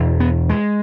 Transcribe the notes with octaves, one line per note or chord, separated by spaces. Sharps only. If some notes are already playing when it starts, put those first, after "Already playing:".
Already playing: E2 B2
B3
G#3